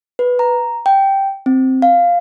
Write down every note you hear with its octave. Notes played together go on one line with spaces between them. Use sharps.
B4
A#5
G5
C4
F5